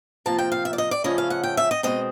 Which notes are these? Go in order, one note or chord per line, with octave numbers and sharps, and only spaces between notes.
C3 F3 A#3 A5
G5
F5
E5
D5
D#5
D5
C#3 F3 A3 C#4 D#5
F5
F#5
G5
E5
D#5
B2 G#3 C4 D#5